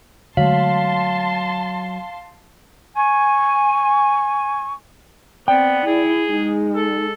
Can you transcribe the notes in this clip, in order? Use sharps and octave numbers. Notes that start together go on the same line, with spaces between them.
D3 F#3 G#3 A3 F5 A5 C6
G#5 C#6
B3 C4 D5 G5
E4 G#4
G#3 D#4
A4